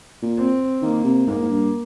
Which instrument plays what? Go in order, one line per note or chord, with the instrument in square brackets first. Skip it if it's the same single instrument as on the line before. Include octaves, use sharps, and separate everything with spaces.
[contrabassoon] A#2
[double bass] C4
[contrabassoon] D#3 [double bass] A#3
[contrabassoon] C3
[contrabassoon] G#2 [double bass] A#3
[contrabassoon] G#2
G2